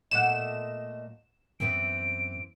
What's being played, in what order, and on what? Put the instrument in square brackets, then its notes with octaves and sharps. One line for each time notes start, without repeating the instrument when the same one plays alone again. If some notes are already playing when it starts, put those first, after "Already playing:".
[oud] A#2 A3 B3 [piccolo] D#5 [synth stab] F#5 E7
[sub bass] F#2 [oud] E3 B3 C4 [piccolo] D7